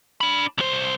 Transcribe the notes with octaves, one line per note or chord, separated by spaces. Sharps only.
D4 B5
C2 C5